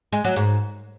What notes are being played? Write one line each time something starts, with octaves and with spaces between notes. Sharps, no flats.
G#3
F#3
G#2